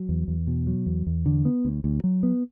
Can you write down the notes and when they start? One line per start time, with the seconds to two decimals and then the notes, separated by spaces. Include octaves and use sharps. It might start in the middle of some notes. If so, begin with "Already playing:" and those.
Already playing: F#3
0.09 E2
0.28 E2
0.47 B2
0.67 F#3
0.86 E2
1.07 E2
1.26 D3
1.45 B3
1.65 D2
1.84 D2
2.04 F#3
2.23 B3